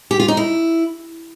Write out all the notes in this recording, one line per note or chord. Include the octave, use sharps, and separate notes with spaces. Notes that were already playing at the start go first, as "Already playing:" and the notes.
G4
F4
D#4
E4